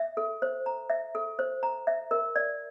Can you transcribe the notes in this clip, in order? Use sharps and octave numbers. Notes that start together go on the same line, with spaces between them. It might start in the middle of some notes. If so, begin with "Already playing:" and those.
Already playing: E5
A4
C5
A#5
E5
A4
C5
A#5
E5
A#4
D5